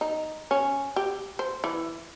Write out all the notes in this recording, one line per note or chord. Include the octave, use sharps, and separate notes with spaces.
D#4
C#4
G4
C5
E3